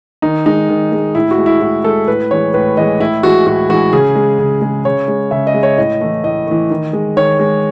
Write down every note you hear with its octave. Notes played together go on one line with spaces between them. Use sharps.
D#3 D#4
G#3 D#4
D#3
G#3
A2 E4
F#4
G#3
E4
A2 F#4
G#3 A4
A2 B4
E3 G#3 C#5
A2 B4
E3 G#3 D#5
A2 E4
E3 G#3 F#4
A2 F#4
E3 G#3 F#4
C#3 G#4
G#3
C#3
G#3
C#3 C#5
G#3
C#3 E5
D#5
G#3
C#5
A2 D#5
E3 A3
A2 D#5
E3 A3
D#3
G#3
D#3 C#5
G#3